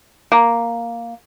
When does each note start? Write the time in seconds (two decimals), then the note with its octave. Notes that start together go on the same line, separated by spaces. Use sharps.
0.32 A#3